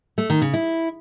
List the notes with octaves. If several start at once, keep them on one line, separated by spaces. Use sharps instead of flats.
A3
D#3
C#3
E4